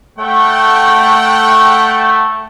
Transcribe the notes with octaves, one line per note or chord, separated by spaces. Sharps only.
A3 F#5 G5